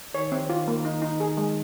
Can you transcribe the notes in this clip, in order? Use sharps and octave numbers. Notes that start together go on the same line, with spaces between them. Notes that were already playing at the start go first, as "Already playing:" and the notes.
D#3 C#5
C4
F4
A#3
D#4
D#4
G#4
G#3